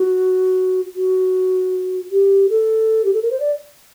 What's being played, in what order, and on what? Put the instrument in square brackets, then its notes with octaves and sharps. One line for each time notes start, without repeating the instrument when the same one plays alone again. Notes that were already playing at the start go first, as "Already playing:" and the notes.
Already playing: [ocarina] F#4
F#4
G4
A4
G4
A4
A#4
C5
D5